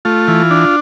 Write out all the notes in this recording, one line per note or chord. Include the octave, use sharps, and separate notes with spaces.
A3 F4
E3
D4